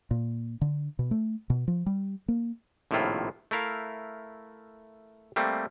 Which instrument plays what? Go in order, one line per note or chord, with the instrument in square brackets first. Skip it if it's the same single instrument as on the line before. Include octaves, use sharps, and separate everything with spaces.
[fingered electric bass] A#2
D3
B2
A3
B2
F3
G3
A#3
[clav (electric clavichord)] A#1 A2 C3 D#3 E4 F4
A3 E4 A#4 F5
G3 A3 A#3 C4